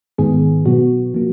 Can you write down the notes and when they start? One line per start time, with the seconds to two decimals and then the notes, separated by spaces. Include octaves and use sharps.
0.18 G#2 D#3 G#3 B3 G#4
0.65 B2 F#3 B3 F#4
1.14 F3 A#3